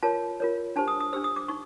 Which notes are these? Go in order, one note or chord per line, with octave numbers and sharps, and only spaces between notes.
F4 A#4 C#5 A5
F4 A#4 C#5
D4 G4 C5 A5
D#6
D#6
D4 G4 C5 E6
D#6
D6
D#4 C#6